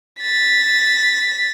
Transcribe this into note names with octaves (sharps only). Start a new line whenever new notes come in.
A6 B6